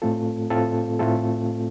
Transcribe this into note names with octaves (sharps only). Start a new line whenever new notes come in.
A2 A3 C4 F4 A4
A2 A3 C4 F4 A4
A2 A3 C4 F4 A4